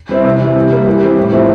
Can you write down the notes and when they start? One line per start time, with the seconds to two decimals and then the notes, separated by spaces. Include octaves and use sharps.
0.09 G3 C4 E4
0.24 C3
0.40 E3 G3
0.56 C3
0.71 G3 A#3
0.87 E3
1.01 G3 C4 G4
1.18 A2
1.32 F3 A3 C4 E4